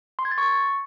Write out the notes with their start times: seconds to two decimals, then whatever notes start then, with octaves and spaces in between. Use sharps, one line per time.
0.19 C6
0.25 G#6
0.31 A6
0.38 C#6